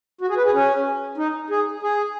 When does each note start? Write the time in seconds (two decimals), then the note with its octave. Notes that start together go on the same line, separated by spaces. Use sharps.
0.21 F#4
0.29 G#4
0.37 B4
0.45 G#4
0.53 C#4
1.18 D#4
1.50 G#4
1.83 G#4